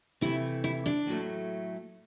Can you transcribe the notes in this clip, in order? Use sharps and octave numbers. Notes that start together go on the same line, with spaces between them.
C3 E3 A3 E4
E4
D4
A2 F#3 A3